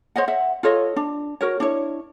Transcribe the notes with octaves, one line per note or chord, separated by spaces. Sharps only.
C5 C#5 D#5 F#5
E5 F#5
F4 A4 C#5 D#5
D4
F#4 A#4 C#5
D4 E4 C#5